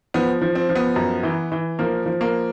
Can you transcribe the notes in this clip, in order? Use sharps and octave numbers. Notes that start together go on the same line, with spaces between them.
F3 B3
F3
C4
F3
B3
F#2
E3
E3
F3 A#3
F3
A#3